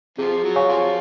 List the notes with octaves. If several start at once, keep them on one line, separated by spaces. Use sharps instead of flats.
C3 F3 G#4
F#3
C#5 F5 G#5 C#6
C3 F3